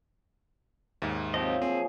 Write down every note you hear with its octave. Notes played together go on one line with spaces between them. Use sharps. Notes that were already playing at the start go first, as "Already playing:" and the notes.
D#2 G#2 E5 A#5 C#6
F3 F#3 C4 F4 G4 D#5
A#2 C4 G#4